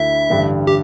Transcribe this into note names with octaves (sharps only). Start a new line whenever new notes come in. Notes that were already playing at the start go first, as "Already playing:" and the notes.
Already playing: D2 D3 A3 E4 E5
A1 G2 D3 G3
G4